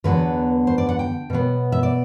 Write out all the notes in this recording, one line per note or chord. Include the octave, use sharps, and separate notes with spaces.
E2 D3 F#3 B3 B4
C5
D5
F#5
G5
B2 F#3 B3
E5
D5